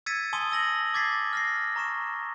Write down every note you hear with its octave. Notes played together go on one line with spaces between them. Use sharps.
E6 G#6 A6 B6 C#7 D#7
G#5 A5 C6 D#6 D#7 G7
E6 A#6 F#7
D6 G#6 A6 B6 C7
F6 A#6 C7
A#5 C#6 E7